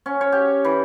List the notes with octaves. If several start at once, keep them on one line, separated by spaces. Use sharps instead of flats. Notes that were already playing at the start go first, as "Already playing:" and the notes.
C#4
C#5
G4
E3